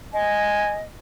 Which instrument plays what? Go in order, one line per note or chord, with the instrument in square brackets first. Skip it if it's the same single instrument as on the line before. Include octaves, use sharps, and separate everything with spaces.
[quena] D#5 [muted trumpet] G#5